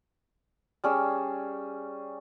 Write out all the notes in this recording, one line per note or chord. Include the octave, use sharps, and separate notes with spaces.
G3 C#4 G#4 E6